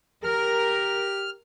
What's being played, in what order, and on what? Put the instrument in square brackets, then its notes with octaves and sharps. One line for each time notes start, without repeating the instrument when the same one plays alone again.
[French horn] G4 [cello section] A#4 [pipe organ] F6